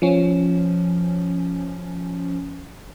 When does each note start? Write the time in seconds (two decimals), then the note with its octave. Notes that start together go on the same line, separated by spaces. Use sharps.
0.02 F3 C#4